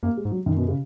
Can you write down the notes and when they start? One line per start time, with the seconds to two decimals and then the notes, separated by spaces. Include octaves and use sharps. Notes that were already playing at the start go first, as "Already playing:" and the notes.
0.03 F#2 A#3
0.17 G#3
0.25 G#2
0.32 F#3
0.46 F#2 D#3
0.57 B2
0.68 C#3